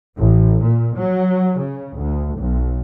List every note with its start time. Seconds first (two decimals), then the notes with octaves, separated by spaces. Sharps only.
0.17 A1
0.62 A#2
0.95 F#3
1.59 C#3
1.96 D2
2.38 B1